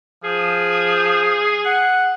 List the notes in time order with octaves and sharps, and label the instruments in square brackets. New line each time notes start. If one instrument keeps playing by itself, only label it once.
[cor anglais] F3 [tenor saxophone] G#4
[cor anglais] F#5